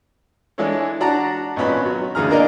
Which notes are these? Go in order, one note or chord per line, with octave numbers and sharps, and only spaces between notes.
E3 G#3 D4 E4 A4 C#5
D4 F#4 D5 F#5 A5 A#5
G#1 A#2 B3 C#4 B5
F#3
D2 C#3 E3 G#4 A#5 F6
A#3 D4 A#4 D5 D#5 F5